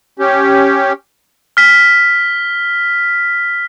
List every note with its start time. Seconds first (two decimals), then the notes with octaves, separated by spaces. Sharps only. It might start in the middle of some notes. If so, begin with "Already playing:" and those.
0.19 C#4 G4
1.57 F6 B6